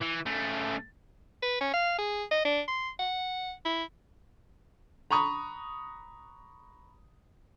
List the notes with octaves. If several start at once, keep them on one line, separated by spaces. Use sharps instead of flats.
E3
C#3 A3
B4
C#4
F5
G#4
D#5
D4
C6
F#5
E4
A#5 B5 C#6 D#6